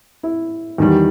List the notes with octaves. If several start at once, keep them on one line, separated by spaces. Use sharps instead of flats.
E4
E2 D#3 G3